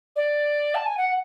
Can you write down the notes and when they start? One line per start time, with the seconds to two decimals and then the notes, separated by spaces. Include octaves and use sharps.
0.16 D5
0.75 A5
0.86 G#5
0.97 F#5